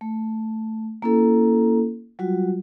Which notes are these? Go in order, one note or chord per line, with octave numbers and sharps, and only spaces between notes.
A3
A#3 C#4 E4 F#4 A4
F#3 G3 F4 F#4